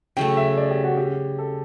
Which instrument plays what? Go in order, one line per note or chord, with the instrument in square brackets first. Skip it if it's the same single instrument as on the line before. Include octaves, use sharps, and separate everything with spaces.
[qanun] C#3 F#3 A3 [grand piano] G5
[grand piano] E5
D5
G4
F#4
G4
A4